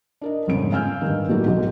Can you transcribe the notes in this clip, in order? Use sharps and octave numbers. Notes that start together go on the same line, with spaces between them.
D4 A#4 D#5
G1 F2 G#2 C#3 D7
F5 G#5 E6 F6 G6
G2 D#3
A2 F#3 G3 A3 A#3 D#4
B1 D#3 F#3 G#3